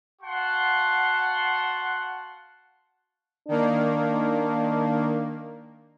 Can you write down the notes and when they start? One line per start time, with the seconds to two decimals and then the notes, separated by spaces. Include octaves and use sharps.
0.22 F#4 F5 F#5 A5 C6
3.49 D#3 A#3 D4